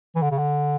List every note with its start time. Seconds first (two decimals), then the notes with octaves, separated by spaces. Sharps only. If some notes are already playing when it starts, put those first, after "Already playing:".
0.16 E3
0.23 D3
0.31 C#3
0.38 D3